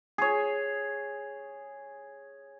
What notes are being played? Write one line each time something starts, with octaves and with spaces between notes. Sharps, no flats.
G#4 C#5